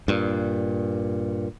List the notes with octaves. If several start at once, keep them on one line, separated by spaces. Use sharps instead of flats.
G2 A#2